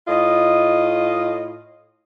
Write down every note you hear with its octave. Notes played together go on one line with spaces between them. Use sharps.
A2 F4 D#5